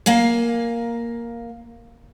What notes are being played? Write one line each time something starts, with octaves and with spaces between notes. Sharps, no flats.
A#3 F5 G#5